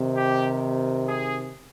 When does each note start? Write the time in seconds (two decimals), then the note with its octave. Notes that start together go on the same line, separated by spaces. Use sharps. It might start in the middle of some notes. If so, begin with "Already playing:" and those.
Already playing: C3 D#3
0.17 G4
1.09 G#4